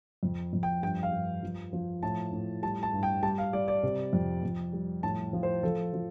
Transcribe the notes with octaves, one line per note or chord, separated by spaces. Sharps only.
F2
F2
G5
G2 G5
F5
G2
F3
F3
A2 A5
A2
G3 A5
A5
G2
G5
G3 A5
F5
G3 D5
D5
C3
F2
F2
G3
A2 A5
F3
C5
F3 A4
F3